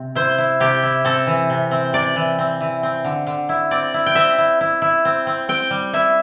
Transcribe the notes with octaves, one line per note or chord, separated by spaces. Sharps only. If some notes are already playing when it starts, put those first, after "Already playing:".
Already playing: C3 C4
E4 C5
E4
C3 G4
E4
C4 A4
E3
C3
C4
C3 D5
E3
C4
E3
C4
D3
D3
E4
C4 D5
E4
G5
C4 E5
E4
E4
E4
C4
C4
C4 G5
G3
E4 E5